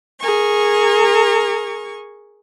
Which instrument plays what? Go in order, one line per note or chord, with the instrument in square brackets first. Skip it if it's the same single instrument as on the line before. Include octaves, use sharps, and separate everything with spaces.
[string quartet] G#4 A#4 C#6